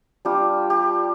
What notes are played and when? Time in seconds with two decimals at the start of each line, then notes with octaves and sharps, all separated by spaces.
0.25 G3 D4 F4 G4
0.70 G4